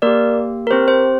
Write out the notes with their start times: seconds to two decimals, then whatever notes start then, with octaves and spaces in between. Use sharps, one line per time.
0.02 A#3 G4 A#4 D5
0.67 A#4
0.70 C4 G4 C5
0.88 C5